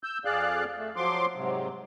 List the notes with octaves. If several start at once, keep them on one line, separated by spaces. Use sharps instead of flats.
E6 G6
F2 G#4 D5 F5 F#6
A3
F3 F#3 C6 D6
G#2 C3 F#3